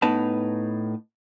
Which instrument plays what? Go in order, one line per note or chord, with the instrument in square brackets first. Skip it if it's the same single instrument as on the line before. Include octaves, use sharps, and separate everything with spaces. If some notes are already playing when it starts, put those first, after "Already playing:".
[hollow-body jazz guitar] A2 B3 D#4 B4 G#5 A5